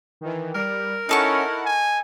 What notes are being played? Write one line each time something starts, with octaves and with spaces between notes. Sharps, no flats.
D#3 E3
G3 A#4
C#4 D#4 E4 A4 F#5 C#6
G#5